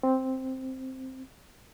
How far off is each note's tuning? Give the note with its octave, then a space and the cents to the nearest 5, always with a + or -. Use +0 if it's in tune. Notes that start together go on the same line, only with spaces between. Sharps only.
C4 +0